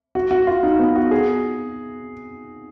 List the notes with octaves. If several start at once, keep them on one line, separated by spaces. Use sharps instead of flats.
F#4
F#4
F4
D#4
B3
F#4
G#4